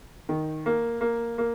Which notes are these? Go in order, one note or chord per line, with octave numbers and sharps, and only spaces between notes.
D#3
A#3
A#3
A#3